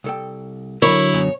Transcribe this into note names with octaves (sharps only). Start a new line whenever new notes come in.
C2 A4 G5
D3 F#3 E4 A#4 C#5 B5
F#2 B2